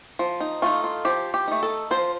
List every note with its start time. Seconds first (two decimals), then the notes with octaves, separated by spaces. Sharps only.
0.19 F3
0.40 D#4
0.62 A3 D#4 F4
0.84 F4
1.05 F3 G4
1.34 G4
1.48 A3 D#4
1.63 A4
1.91 F3 C5